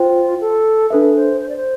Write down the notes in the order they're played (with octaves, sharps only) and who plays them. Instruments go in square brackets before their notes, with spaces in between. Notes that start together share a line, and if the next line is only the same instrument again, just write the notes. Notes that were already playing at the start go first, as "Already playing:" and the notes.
Already playing: [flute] F4 [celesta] C5 G5
[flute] A4
[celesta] D4 A4 E5 [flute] B4
[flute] C5
C5
D5
C5